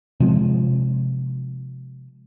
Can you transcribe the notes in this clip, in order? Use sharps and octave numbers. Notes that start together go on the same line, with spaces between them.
C3 F3 G#3